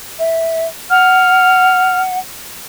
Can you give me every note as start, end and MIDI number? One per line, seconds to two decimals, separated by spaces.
0.19 0.67 76
0.90 2.19 78
0.90 2.02 89